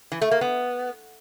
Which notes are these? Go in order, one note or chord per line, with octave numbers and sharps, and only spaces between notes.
E3
A3
A#3
B3